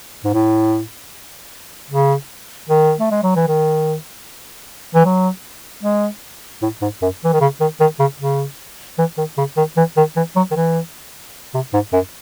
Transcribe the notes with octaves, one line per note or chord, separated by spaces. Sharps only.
G#2
A2
C#3
D#3
A3
G#3
F#3
E3
D#3
E3
F#3
G#3
A2
G#2
F#2
E3
D#3
C#3
D#3
D#3
C#3
C#3
E3
D#3
C#3
D#3
E3
D#3
E3
F#3
D#3
E3
C3
G#2
F#2